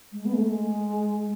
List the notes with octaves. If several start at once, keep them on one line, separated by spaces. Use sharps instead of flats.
G#3
B3
G#3
A3
G#3